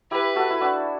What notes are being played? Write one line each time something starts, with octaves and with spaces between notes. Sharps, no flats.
E4 G4 B4
F#4 A4
E4
D4 F#4